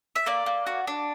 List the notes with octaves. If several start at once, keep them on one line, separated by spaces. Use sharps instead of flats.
E5
A#3 D5
A#3
F#4
D4